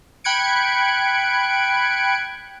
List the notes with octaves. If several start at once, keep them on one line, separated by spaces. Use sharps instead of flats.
G5 B5 F#6 G#6 C#7 D7